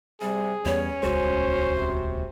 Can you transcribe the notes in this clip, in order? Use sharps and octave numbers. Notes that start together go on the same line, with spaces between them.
C3 G3 G#4
E2 G3 B3 C#4 C#5
D#1 C#2 G#3 F#4 C5
C3